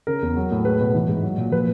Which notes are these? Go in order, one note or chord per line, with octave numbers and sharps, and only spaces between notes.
C#3 A#4
E2
F#3
A2
G#3 B4
B2
E3
G#2
F#3
A#2
F3 B4